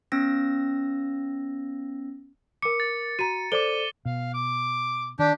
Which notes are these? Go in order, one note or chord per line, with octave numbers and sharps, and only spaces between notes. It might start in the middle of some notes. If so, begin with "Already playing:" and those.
B3 C#4 E6 A#6
A#4 D6 C#7
A6
F#4 A#5 D#7
A4 C5 D5 D6 G7
B2 F5
D6
D#3 D4 G4